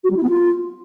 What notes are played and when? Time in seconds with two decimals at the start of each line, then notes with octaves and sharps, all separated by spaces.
0.03 F#4
0.10 G3
0.16 E4
0.23 B3
0.29 F4